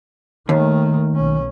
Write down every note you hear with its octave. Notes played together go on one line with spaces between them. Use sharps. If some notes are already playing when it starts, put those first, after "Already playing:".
D#2 D#3 A3
B1 C#4